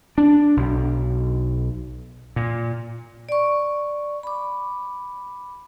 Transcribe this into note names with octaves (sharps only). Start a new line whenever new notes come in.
D4
B1
A#2
D5 C#6
B5 D6